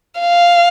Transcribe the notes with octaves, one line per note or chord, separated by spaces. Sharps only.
F5